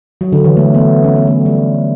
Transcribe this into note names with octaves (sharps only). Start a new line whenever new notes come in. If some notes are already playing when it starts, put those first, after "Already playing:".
F#3
D3
E3
A3
B3
C#4
B3
A3
G3